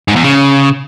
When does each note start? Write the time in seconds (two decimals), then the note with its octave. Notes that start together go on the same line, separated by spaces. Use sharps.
0.08 G#2
0.16 E2
0.24 C#3